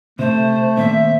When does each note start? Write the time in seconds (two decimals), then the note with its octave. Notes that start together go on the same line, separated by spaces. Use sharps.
0.19 C3 A3 C5
0.77 A#2 D#3 C4 E5